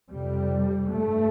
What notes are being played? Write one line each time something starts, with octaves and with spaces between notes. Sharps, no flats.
F2 C3 G3
G2 A3